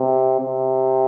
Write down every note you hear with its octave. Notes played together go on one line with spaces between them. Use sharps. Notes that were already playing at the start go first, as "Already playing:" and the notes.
Already playing: C3
C3